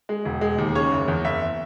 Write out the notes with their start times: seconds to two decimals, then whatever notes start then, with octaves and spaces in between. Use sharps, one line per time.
0.09 G#3
0.25 E1
0.41 G#3
0.58 D#2
0.75 C#3 C#5
0.92 F#1
1.08 E2
1.24 F#1 E5